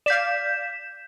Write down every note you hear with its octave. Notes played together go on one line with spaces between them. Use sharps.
D5 F5 G6 B6 E7